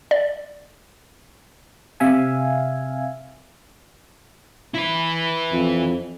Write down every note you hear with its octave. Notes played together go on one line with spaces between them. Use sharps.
D5
C3 E5 F5 G#5
E4 B4
F2